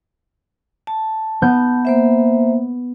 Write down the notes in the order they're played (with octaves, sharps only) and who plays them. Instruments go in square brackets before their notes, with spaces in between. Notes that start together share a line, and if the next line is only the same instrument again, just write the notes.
[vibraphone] A5
[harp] B3 G6
[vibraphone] A#3 C5 E5